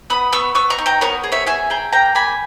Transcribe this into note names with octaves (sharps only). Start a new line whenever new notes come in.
B3 B5 D#6
B3 C#6 E6
B3 C#6 E6
A#5 C#6
D#4
G5 A#5
B3 A#4 C#5
G#4
C#5 E5
G#4 E5 G#5
G#4 G5 A#5
A#3 G5 A#5
A#3 G#5 B5